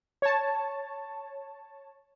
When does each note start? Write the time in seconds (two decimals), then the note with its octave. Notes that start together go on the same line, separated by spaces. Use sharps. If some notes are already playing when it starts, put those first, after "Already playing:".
0.22 C#5 A5